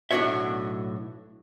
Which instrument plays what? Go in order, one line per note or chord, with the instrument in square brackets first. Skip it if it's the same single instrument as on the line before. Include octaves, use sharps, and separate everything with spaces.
[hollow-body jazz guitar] B1 A2 D4 F#4 C#5 E5